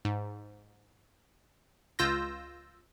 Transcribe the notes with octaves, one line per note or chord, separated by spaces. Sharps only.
G#2
C#2 F4 E6 G6 A#6